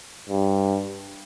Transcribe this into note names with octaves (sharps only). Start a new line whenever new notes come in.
G2